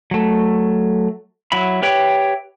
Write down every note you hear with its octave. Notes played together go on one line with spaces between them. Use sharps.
F#3 A3
F#3 E4 E5 B5
G4 B4 C#5 E5 G5